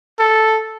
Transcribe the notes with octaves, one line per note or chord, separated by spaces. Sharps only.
A4